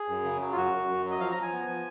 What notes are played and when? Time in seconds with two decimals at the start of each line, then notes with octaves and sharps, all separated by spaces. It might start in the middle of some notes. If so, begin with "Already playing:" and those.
Already playing: G#4
0.08 F#2
0.24 C#3
0.41 F#3
0.52 F4
0.56 F#2 F#4
0.73 F#2
0.88 F#2
1.05 F#3
1.11 D#5
1.20 F3 F5
1.31 A#5
1.37 F3
1.42 G#5
1.52 B3
1.68 F3